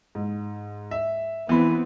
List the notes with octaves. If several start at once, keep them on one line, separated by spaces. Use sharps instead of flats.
G#2
E5
E3 B3 C4 B5